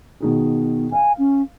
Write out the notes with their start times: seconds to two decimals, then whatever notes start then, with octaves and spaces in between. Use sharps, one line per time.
0.21 B2 D#3 G#4
0.92 F5 G#5
1.18 C#4